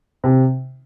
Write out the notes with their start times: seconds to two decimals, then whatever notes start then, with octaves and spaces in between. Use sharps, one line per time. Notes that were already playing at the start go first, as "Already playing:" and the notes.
0.24 C3